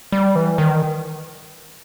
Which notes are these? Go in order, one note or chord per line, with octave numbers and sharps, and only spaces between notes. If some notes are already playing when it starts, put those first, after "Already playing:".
G3
E3
D#3